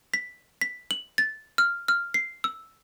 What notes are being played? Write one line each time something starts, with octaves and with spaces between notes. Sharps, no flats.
B6
B6
F#7
A6
F6
F6
C7
E6